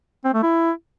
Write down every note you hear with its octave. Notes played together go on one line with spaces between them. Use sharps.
C4
A3
E4